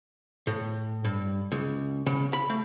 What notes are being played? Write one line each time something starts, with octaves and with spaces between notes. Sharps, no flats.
A2
G2
C#2
C#3
B5
A3